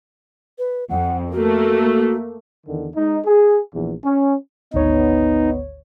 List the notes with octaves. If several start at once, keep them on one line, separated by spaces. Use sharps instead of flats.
B4
F2 F#5
A3 A#3 F#4
E2 D3 D#3
G#3 D#4
G#4
A#1 E2
C#4
G#1 D2 B3 D#4 C#5